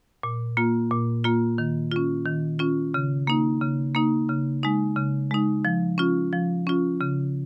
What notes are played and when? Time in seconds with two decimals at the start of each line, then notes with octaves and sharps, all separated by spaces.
0.23 A#2
0.57 A#3 F4
0.91 A#2
1.24 A#3 F4
1.58 D#3
1.92 C#4 F4
2.25 D#3
2.59 C#4 F4
2.94 C#3
3.27 A#3 D#4
3.61 C#3
3.95 A#3 D#4
4.29 C#3
4.63 G#3 D#4
4.96 C#3
5.31 G#3 D#4
5.65 F3
5.98 C#4 F4
6.33 F3
6.67 C#4 F4
7.01 C#3